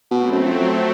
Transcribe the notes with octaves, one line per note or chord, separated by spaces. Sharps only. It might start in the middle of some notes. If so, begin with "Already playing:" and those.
B2 F#3 A3 C4
F#2
F2